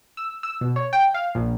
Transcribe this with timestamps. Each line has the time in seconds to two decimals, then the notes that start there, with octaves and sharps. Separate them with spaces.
0.17 E6
0.43 E6
0.61 B2
0.76 C#5
0.93 G5
1.14 F5
1.35 A#1